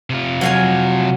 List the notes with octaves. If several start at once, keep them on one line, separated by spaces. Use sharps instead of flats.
C3 F4
F#3 F5 G#5